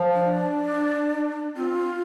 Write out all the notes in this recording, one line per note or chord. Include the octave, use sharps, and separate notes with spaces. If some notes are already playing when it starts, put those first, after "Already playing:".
Already playing: F3
D4
C4 F4